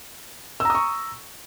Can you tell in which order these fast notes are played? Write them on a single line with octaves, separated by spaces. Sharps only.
E6 A#5 D#6 C#6